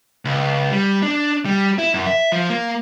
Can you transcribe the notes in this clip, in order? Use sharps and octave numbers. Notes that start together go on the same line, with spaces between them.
C#2
G3
D4
G3
E4
F#2
E5
F3
A#3